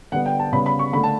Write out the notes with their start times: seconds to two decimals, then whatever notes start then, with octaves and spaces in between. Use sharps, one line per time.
0.12 D3 G3 B3 F#5
0.26 G5
0.39 A5
0.52 C#3 G3 B3 B5
0.66 B5
0.79 C#6
0.93 D3 B5
0.97 A3
1.03 A5